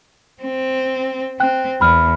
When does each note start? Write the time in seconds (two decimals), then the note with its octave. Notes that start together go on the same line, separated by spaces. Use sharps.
0.42 C4
1.40 C4 G5 F#6
1.81 E2 B5 F6